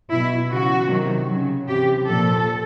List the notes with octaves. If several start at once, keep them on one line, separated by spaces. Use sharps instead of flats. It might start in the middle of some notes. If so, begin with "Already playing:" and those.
B2 F#3 E4
C#3 E3 F#4
C3 D#3 F#3
C#3 F#3
C3 E3 G4
A#2 F3 A4